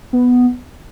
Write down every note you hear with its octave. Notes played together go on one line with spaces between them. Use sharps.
B3